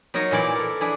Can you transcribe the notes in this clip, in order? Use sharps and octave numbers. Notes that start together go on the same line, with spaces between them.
F#3 D#4 A#4 C#5 D#5
A#2 E3 E4 D5
A4 A#4
D4 E4 G#4